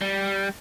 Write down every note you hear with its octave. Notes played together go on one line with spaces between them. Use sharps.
G3